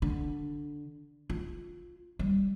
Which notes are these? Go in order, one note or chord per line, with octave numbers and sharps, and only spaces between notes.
D3
F4
G3